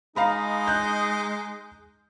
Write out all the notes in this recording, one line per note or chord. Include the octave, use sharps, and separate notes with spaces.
G#3 D#4 F5 A#5 B5
F#6 G6